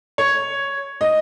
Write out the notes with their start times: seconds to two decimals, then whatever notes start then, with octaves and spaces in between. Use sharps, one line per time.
0.18 C#5
1.01 D#5